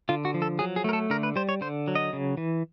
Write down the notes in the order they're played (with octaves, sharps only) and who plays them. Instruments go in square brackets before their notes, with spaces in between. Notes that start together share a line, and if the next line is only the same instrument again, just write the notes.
[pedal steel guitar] D3 F4
F#4
F3
A4
F#3 G#4
G#4
A3 A#4
A4
D3 A#4
B4
G3 C5
C#5
D3 C5
F#3
D#5
C#3
E3